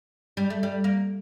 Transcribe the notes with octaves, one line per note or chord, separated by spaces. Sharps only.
G3
A3
G3
A#3